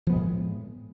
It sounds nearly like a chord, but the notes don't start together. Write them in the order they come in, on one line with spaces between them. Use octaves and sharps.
F3 B3 G#3 A2